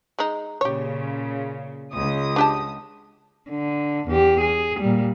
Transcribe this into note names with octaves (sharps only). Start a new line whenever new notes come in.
G#3 D#4
A#2 C#3 G4 C#5
C#2 D#6
D4 G4 A5
D3
E2 G4
G#4
A#2 G3